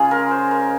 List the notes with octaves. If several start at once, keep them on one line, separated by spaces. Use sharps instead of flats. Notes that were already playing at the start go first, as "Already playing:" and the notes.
Already playing: C#3 G#3 C#4 F4 G#4
A#4
C5
A#4